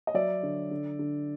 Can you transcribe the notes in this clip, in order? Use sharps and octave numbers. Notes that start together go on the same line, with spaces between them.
D#5
F#3 D5 E5
D3
D3
D3